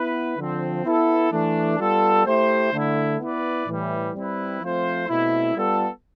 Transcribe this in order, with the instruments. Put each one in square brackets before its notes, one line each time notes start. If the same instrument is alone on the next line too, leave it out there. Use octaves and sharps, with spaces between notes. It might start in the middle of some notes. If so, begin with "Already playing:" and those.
Already playing: [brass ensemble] B3 E4 B4
D3 F3 C4
B3 E4 A4
E3 A3 D4
G3 B3 F4 A4
A3 E4 G4 C5
D3 A3 E4
B3 E4 B4 D5
A2 E3 G3
G3 C4 E4 B4
F3 A3 C4 F4 C5
B2 A3 C4 E4
G3 B3 F4 A4